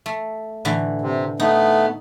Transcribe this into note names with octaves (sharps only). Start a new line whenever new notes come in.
A3
A2 D3 E3
C3
A3 B3 D#4